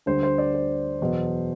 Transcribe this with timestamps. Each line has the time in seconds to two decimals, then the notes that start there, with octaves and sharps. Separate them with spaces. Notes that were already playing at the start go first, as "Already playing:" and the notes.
0.06 D2 D3 G3 C5
0.23 C5
0.38 D5
0.54 C5
1.01 E2 B2 F#3